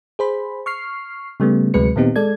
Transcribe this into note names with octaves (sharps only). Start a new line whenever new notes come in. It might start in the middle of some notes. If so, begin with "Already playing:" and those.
G#4 C5 B5
C#6 F6 C7
C#3 G3 A3 B3
D2 C3 F#3 G#3 B4 C#7
A#2 D#3 B3 C4 D#4 G4
G#3 A4 D5 G#6